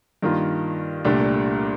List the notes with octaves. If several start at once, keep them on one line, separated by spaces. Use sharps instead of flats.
G2 D#3 A#3 F4
C2 A#2 A3 D4 G4